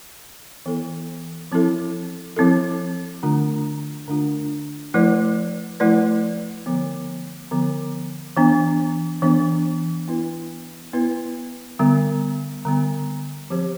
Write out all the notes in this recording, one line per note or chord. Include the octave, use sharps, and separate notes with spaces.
E3 B3 E4 A4
F3 C4 E4 A4
F3 C4 E4 A4
D3 A3 D4 F4
D3 A3 D4 F4
F3 A3 E4 B4 D5
F3 A3 E4 B4 D5
D3 F3 B3
D3 F3 B3
E3 B3 D4
E3 B3 D4
B3 E4 B4
B3 E4 B4
D3 G3 B3
D3 G3 B3
F3 C4 G4 C5